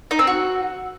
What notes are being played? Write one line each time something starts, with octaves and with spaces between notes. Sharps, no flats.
D#4
C4
F#4